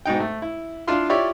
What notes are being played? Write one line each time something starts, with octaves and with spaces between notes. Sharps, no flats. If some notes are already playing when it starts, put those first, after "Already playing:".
G#2 B2 D#4 G5
A3
E4
D4 E4 F4 F5 C6
E4 F4 G4 C#5 D5 E5